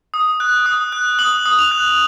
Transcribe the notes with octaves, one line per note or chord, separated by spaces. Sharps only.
D#6
F#6
D#6
F#6
D#6 F#7
D#6
F7
F#6